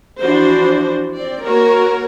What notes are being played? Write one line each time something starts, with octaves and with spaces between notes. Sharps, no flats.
E3 F3 D4 F#4 C5
C4 D5
A#3 F#4 A#4 C#5